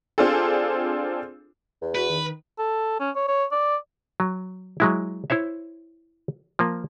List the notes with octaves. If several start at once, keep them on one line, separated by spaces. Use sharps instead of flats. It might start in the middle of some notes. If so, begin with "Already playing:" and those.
C4 D4 F4 G#4 A4
E2
F#4 B4
D#3
A4
C#4
C#5
C#5
D5
F#3
F#3 G#3 E4
E4 C5 C#5 E5
F3 A#3